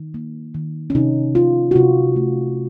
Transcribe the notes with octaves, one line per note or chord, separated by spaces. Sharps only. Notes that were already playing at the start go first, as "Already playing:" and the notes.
Already playing: D#3
A#3
D#3
C#4
C3 D#4
C3 F4
F#4
C3 F4
A3